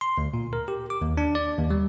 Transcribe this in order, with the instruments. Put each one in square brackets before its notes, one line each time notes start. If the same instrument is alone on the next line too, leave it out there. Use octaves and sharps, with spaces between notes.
[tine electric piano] C6
D2
A#2
A#4
G4
D6
D#2
D4
D5
D#2
G3